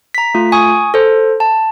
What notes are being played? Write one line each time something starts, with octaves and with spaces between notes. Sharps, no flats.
A#5 B6
A3 F4
G#5 C#6 D#6
A4 C5
A5